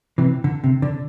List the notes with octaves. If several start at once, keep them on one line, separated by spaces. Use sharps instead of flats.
C3 E3
D3
C3
D3